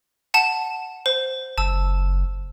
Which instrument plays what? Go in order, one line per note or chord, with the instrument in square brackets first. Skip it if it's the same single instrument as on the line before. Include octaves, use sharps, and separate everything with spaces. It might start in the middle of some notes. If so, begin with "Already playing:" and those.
[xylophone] F#5 A5 E7
C5
[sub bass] F#1 [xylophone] A5 E6